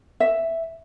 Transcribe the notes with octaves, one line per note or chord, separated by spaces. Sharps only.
E5